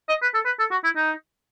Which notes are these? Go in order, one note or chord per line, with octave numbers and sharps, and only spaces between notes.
D#5
B4
A4
B4
A4
F#4
E4
D#4